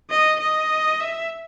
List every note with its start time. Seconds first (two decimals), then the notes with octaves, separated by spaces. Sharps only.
0.11 D#5
0.40 D#5
1.00 E5